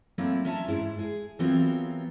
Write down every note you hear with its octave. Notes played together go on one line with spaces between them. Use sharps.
F#3 A3 A#3 C4 E4 F4
C#4 F4 E5 A5 A#5
G#2 G#3 E4
G#4
E3 F#3 B3 C4 F4 A#4